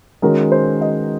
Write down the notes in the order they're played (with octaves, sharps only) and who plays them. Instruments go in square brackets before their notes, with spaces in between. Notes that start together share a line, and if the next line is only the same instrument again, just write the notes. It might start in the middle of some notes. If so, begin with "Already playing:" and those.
[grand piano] D#3 G#3 C#4 F#4 [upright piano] A#4
[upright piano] C5
D#5